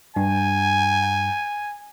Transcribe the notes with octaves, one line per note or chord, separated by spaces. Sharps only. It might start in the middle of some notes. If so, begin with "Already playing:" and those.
G2 G#5